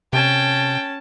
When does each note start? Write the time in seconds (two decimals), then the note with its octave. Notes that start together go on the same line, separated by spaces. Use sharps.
0.13 C3 C#4 G5 A5